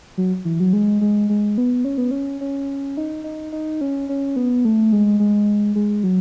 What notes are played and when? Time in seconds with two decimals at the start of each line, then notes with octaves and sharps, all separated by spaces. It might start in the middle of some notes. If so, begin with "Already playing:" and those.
0.18 F#3
0.45 E3
0.60 F#3
0.73 G#3
1.01 G#3
1.29 G#3
1.58 B3
1.85 C#4
1.98 B3
2.11 C#4
2.41 C#4
2.97 D#4
3.24 D#4
3.52 D#4
3.81 C#4
4.09 C#4
4.36 B3
4.65 A3
4.92 G#3
5.20 G#3
5.76 G#3
6.04 F#3